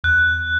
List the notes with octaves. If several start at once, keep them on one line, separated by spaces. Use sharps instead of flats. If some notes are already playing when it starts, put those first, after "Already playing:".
E2 F#6